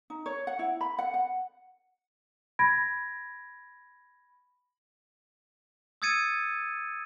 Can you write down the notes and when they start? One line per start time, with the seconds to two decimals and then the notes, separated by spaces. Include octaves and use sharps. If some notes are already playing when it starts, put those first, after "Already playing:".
0.10 D#4
0.26 C#5
0.47 F#5
0.59 E4
0.81 B5
0.99 F#5
1.14 F#5
2.59 B5 G#6 A#6 D7
6.02 D#6 E6 G#6 A6 C#7 D#7